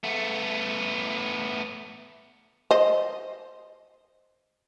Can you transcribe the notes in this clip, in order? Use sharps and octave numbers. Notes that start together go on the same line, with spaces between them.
A3 B3
C5 D#5